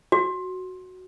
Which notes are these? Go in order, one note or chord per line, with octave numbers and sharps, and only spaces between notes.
F#4